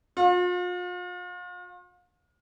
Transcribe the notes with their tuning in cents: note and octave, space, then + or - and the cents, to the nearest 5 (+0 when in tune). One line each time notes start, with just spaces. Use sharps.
F4 +40